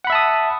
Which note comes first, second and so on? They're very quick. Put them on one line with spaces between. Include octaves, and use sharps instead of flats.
F#5 B5 E5 A5 D#6